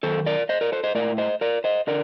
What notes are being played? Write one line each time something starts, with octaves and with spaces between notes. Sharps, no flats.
F#2 D#3 A4 C5
A#4 D5
C5 D#5
A#4 D5
A4 C5
C5 D#5
A2 A#4 D5
C5 D#5
A#4 D5
C5 D#5
D3 A#4 D5